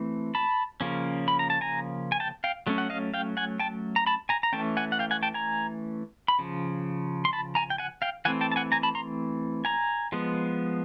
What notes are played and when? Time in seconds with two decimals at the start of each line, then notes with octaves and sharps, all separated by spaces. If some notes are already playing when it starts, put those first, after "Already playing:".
Already playing: E3 A3 C4
0.35 A5 B5
0.81 C#3 F3 A#3 C#4
1.28 B5
1.39 A#5
1.50 A5
1.61 G#5 A#5
2.12 G#5
2.20 G5 A5
2.44 F5 G5
2.67 F#3 A3 C#4
2.78 F#5
2.90 D#5 F5
3.14 F5 G5
3.37 F#5 G#5
3.60 G5 A5
3.96 A#5
4.06 A5 B5
4.29 G#5 A#5
4.43 A#5
4.53 E3 A3 C#4 G5 A5
4.77 F#5 G#5
4.92 F#5
4.99 F5 G5
5.11 F#5 G#5
5.23 G5 A5
5.34 G#5 A#5
6.28 B5
6.39 C#3 F3
7.25 C6
7.33 A5 B5
7.55 G#5 A#5
7.70 G5
7.78 F#5 G#5
8.02 F5 G5
8.25 E3 A3 C4 F#5 G#5
8.41 G5 A5
8.51 A5
8.56 F#5 G#5
8.72 G#5 A#5
8.83 A5 B5
8.95 A#5 C6
9.65 G#5 A#5
10.12 F3 G#3 B3